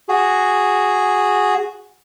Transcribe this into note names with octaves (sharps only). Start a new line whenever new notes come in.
F#4 G#4